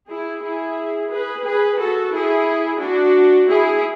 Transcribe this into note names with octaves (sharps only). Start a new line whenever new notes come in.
E4 G#4
E4 G#4
G#4 B4
G#4 B4
F#4 A4
E4 G#4
D4 F#4
E4 G#4